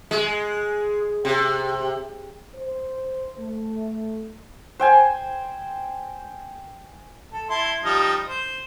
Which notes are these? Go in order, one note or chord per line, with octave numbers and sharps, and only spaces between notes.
G#3
C3
C5
A3
C5 G5 G#5
A4
E4 A5 C6
F3 G3 D#4
C5